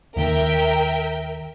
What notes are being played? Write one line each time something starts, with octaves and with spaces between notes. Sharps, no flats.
D#2 D#3 A#4 E5 G5